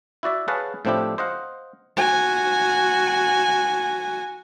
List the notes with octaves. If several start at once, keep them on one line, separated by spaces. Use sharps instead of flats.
E4 F#4 D5 E5
G#4 B4 C#5 F5 F#5 A5
A2 F3 C4 D4 E4 G4
C5 D#5 F5 F#5
F#4 G#5